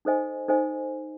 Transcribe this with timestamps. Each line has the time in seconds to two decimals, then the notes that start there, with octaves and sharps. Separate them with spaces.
0.05 D#4 A4 C5 D#5 G#5
0.48 D#4 A4 C5 D#5 G#5